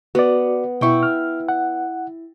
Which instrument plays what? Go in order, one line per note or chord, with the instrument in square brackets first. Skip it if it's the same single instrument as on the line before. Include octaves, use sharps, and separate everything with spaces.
[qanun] B3 [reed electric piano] F#4 D5
[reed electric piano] B2 C#6 [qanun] E4 G5
[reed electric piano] F6
F#5